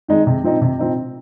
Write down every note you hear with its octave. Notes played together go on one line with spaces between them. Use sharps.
D#3 G#3 D#4
C3
F3 C4 D#4
C3
F3 C4 D#4